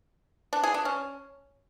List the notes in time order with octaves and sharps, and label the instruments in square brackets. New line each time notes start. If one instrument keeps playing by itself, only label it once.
[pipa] D4
G#4
D4
C#4